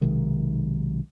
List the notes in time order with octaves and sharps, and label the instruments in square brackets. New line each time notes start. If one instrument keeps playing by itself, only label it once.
[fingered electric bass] B1 C3 D#3 G#3